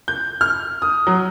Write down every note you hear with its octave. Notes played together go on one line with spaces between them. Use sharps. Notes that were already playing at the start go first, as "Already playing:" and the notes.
G6
F6
D#6
F#3